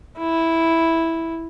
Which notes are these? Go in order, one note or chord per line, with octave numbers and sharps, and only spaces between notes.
E4